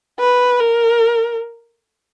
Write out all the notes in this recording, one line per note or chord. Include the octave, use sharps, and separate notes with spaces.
B4
A#4